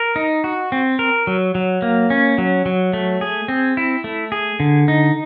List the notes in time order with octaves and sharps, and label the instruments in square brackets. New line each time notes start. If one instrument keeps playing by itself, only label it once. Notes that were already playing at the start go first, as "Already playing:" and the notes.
Already playing: [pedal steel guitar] A#4
D#4
F#4
C4
A#4
F#3
F#3
A#3
C#4
F#3
F#3
A3
G#4
C4
E4
A3
G#4
D3
D#4